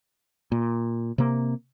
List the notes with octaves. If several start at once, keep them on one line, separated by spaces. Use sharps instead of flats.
A#2
C3 A#3